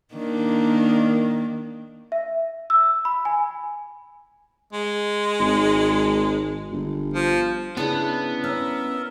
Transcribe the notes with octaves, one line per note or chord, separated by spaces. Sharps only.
D#3 A#3 D4
E5
E6
B5
G#5
G#3
G#1
G1
F3
C#3 B3 D4 E4 C5
C#4 A#4 E5